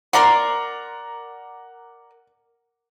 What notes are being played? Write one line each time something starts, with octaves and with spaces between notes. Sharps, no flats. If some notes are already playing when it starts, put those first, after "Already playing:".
A#4 D5 F#5 A#5 C6